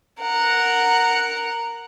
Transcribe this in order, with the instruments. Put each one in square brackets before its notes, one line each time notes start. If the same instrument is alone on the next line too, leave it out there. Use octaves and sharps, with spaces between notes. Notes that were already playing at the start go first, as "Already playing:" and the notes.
[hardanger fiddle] A#4 F#5